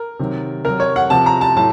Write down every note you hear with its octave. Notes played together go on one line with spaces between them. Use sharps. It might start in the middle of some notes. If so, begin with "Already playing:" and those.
Already playing: A#4
C3 D#3 F#3
C3 F#3 A#4
C#5
F#5
C3 F3 A5
A#5
A5
A2 F#3 A5